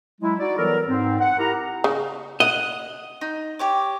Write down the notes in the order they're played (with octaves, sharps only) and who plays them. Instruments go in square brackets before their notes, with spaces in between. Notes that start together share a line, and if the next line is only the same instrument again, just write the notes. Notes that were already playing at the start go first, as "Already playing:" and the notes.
[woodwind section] F#3 G#3 E4
D#4 F#4 D5
E3 F#3 G3 B3 A4 A#4
G#2 C4
F#5
E4 G4 A#4 A#5
[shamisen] C#3
[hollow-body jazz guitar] D#5 [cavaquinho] F#5
[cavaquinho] D#4
G4 C#5 D6